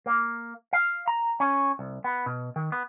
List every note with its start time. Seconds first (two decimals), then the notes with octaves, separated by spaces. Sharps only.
0.06 A#3
0.73 F5
1.08 A#5
1.40 C#4
1.79 C2
2.04 B3
2.26 B2
2.56 D#3
2.72 B3